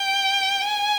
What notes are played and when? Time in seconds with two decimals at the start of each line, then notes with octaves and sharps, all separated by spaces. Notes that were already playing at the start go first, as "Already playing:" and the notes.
Already playing: G5
0.62 G#5